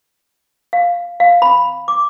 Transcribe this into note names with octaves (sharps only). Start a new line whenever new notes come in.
F5
F5
B5
D6